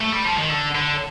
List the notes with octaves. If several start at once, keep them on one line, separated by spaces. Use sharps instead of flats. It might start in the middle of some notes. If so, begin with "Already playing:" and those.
A3
G3
F3
D#3
D3
D3